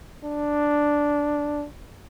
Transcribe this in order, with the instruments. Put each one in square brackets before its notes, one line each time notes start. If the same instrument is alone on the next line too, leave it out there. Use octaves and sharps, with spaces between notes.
[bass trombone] D4